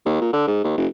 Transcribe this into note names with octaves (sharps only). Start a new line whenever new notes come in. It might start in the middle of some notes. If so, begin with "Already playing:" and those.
D#2
A#2
D3
G#2
D#2
F#1